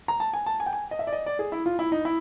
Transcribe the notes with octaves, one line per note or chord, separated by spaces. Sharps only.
A#5
A5
G#5
A5
G#5
G5
G#5
D#5
E5
D5
D#5
D5
G#4
E4
F4
E4
D#4
E4